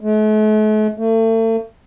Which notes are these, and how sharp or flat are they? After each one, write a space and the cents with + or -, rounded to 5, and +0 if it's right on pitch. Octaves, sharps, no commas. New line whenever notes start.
A3 -45
A3 +35